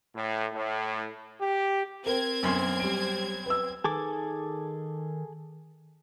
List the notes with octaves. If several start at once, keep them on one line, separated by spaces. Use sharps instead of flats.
A2
A2
G4
C4 A#4 G#6
B1 F#2 C6
G3 D7
B4 E6
D#3 G#4 A4 D6